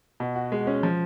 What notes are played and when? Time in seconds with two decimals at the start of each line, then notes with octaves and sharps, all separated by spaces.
0.20 B2
0.36 F#4
0.52 G#3
0.67 C#4
0.83 F3